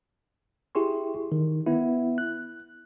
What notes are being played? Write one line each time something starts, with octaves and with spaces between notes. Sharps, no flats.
E4 G4 G#4 C6 C#6
D#3
B3 E4
F#6